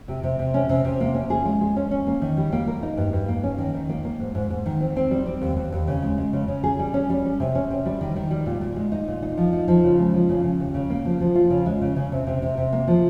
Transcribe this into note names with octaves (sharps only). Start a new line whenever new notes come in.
C3
C3
C3
C#4
C3
C3
A#3
C#4
G#4
G#3
G#3
C#4
C#4
A#3
D#3
G3
A#3
A#4
D#4
G2
G2
A#3
C#4
D#3
D#3
A#3
A#3
G#2
G#2
G#2
D#3
C4
C4
G3
C4
D#2
D#2
D#2
C#3
G#3
G#3
C#3
C#3
G#4
G3
C#4
G3
C#4
C3
C#4
C3
G3
D#3
D#3
G3
A#2
A#2
G#3
D#4
A#2
D#4
F3
D#4
F3
C#3
G#3
F3
C#3
C#3
D#2
C#3
A#3
F3
F3
F4
C#3
G#3
C#3
C#3
C3
C3
C3
C3
A#3
F3